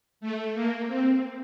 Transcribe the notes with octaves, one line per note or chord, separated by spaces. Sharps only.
A3
A#3
C4